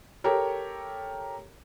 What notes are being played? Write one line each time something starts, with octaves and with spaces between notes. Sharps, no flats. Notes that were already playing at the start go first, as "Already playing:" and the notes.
G4 A4 A#4 C#5